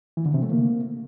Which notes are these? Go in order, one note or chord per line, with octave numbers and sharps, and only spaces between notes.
E3
D3
C3
A3
A#3